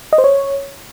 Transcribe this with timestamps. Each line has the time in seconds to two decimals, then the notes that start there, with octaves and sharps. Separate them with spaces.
0.13 D#5
0.18 C5
0.24 C#5